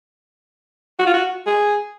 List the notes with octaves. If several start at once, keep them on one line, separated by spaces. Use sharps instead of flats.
F#4
F4
F#4
G#4